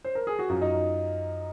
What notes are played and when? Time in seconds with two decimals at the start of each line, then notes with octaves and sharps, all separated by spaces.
0.05 C5
0.15 A#4
0.27 G#4
0.39 F#4
0.50 F#2 F4
0.61 D#4